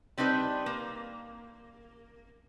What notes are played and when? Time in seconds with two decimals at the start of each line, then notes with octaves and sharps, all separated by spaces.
0.18 G3 C4 D4 D#4 B4
0.66 A#3